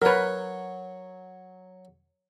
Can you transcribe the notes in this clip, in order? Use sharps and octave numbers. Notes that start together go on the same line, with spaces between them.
F#3 A#4 B4 C#5